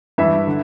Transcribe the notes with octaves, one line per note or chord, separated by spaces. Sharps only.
G2 E3 E5
D3